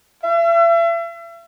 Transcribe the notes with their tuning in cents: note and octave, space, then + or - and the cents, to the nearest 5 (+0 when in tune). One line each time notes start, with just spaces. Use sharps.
E5 +40